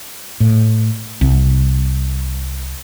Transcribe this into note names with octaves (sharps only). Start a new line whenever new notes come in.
A2
C2